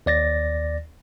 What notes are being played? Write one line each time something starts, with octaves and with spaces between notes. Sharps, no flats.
D#2 D5 A6 A#6